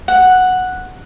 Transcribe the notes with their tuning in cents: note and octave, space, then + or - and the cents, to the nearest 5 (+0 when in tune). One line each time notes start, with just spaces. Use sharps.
F#5 -5